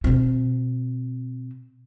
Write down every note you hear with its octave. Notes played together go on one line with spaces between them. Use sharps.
B2 C4